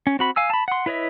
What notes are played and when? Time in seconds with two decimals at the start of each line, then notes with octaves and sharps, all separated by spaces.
0.07 C#4
0.19 C4 F#4 B5
0.36 F5 G#5 E6
0.50 A5 B5
0.68 F#5 C6
0.86 E4 B4 C#5 D#5 E5